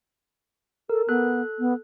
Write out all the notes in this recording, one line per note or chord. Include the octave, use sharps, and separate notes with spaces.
A4 A#4
B3 A4 F#6
B3